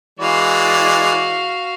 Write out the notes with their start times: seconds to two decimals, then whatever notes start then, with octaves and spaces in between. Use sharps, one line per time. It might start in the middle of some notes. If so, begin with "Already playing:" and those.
0.20 E3 G#3 F#4 D5 F5